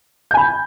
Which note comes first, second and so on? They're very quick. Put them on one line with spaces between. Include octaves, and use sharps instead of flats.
G6 G#5 B5